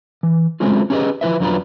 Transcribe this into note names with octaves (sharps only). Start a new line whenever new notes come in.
E3
F#3 G#3 A3 C4 C#4 F4
C#4 G4 G#4 B4 D#5
F3 E4 B4 E5
F2 F#3 D4 F4 B4 A#5